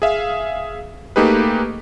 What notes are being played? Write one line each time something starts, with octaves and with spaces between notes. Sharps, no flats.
G#4 E5 F5
A3 A#3 D#4 G4 G#4 B4